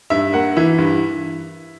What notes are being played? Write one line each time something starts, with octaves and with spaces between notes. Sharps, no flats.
G2 E5
A#3 F#5
E3 E5
G2